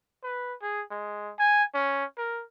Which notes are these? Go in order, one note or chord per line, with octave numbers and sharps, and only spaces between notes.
B4
G#4
G#3
G#5
C#4
A#4